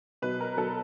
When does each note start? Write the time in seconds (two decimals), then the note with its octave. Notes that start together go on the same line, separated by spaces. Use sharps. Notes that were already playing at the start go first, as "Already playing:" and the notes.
0.22 B2 F#3 B4
0.41 A#4
0.58 B2 F#3 A4